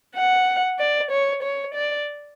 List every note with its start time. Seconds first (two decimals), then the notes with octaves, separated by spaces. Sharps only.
0.15 F#5
0.79 D5
1.11 C#5
1.43 C#5
1.74 D5